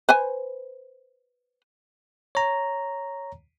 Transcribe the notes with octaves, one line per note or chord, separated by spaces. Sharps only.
B4 C5 G#5
C#5 A#5